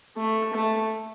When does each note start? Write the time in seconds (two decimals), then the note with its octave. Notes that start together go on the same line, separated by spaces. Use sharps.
0.17 A3
0.53 A3